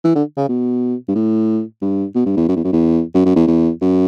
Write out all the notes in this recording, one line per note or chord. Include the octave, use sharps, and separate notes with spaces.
E3
D3
C#3
B2
G2
A2
G2
B2
G2
E2
F#2
E2
F#2
E2
F#2
F#2
E2
E2
F#2